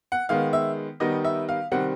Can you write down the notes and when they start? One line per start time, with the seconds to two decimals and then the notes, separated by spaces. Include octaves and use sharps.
0.12 F#5
0.29 D#3 G#3 B3 F5
0.53 E5
1.00 D#3 G3 B3 D#4 D#5
1.24 E5
1.49 F5
1.71 C3 D#3 G3 C4 F#5